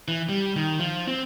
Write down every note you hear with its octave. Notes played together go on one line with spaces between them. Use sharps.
E3
G3
D#3
F3
C4